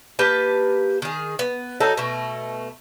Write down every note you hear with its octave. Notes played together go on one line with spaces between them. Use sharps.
A#3 G4 B4 A5
D#3 G#4
B3
F#3 D#4 A4
B2 A3